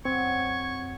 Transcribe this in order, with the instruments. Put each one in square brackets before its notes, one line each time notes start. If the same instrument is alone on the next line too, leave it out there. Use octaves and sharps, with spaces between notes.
[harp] F#2 [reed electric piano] C4 [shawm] C#6 [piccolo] G#6